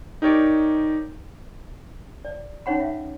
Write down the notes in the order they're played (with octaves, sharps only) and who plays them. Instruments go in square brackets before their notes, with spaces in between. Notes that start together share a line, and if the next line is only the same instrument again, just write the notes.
[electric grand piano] D#4 G4 A#4 C#5 D5
[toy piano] D5
C#4 D#4 C#5 F#5 B5
E5 F5